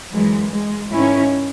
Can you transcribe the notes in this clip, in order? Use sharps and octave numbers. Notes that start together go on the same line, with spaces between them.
F#2 E3 G#3
G#3
G#2 D#3 C#4 E4